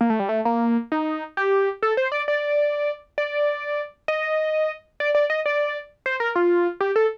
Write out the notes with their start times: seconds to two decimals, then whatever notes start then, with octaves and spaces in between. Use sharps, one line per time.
0.01 A#3
0.10 A3
0.20 G3
0.29 A3
0.45 A#3
0.92 D#4
1.37 G4
1.82 A4
1.97 C5
2.12 D5
2.28 D5
3.18 D5
4.08 D#5
5.00 D5
5.15 D5
5.30 D#5
5.46 D5
6.06 C5
6.20 A#4
6.35 F4
6.80 G4
6.96 A4